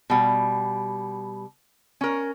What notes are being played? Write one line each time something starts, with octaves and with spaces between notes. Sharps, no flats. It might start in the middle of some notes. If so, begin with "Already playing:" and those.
B2 G3
C#4 A#4